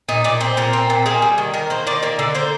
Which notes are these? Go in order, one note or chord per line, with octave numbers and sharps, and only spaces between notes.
A#2 D#4
A#2 D5
C4 C5
A#2 A#4
C4
A#2
A#3 G#4
G3
D#3
D#3 A#4
A#3 C5
D#3 D5
A#3 D5
D3 D5
A#3 C5